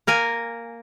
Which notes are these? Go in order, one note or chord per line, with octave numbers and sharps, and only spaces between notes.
A#3 A#4 G#5